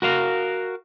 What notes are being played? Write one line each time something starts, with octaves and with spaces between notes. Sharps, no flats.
F#4 A#4 F5